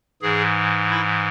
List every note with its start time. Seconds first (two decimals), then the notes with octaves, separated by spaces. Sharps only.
0.22 G#2 E3 G#4
0.90 E4